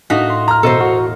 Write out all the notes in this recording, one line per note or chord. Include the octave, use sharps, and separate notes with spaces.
A2 D#4 F#4 F5 B6
C6
A#5 F6
E1 B2 A4 C5 D#5 C#6
F#4